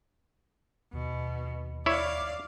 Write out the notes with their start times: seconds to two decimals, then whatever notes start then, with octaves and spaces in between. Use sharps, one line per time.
0.93 D#2 B2
1.86 E4 C#5 D5 F5